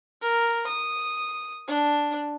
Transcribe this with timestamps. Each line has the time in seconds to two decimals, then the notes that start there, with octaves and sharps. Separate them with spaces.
0.22 A#4
0.67 D#6
1.67 D4